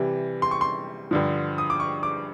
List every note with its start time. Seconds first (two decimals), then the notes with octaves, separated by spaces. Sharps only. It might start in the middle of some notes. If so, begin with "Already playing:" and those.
Already playing: C3 E3 G3
0.42 C6
0.51 C#6
0.61 C6
1.11 G2 D3 F3
1.58 D#6
1.70 D6
1.80 C#6
2.03 D6